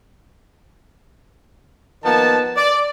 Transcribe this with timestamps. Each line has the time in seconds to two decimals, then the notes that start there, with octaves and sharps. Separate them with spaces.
2.04 D#3 F3 A#3 B3 A5
2.57 D5